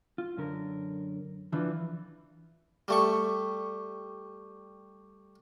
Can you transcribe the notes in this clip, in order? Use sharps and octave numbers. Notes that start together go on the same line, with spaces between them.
F4
F#2 D3 A#4
E3 F3 D4 F4
G3 A3 C#6